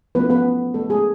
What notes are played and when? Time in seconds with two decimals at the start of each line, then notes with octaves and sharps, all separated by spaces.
0.15 F3 A3 B3 C#4 B4
0.30 B3 B4
0.74 A3 A4
0.89 G#3 G#4